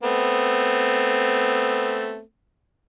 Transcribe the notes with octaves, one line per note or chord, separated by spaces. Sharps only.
A3 B3 C4